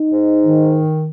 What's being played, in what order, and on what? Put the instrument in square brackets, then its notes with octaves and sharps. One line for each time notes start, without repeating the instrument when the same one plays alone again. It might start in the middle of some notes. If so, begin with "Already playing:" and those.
Already playing: [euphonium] D#4
[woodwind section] G#2
D#3